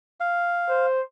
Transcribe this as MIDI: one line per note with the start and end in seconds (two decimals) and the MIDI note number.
0.20 0.86 77
0.68 1.01 72